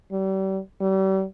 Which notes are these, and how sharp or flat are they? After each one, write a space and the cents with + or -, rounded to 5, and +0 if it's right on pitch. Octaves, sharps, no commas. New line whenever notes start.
G3 -35
G3 -40